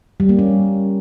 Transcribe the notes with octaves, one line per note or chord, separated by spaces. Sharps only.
G3
A#3
C#4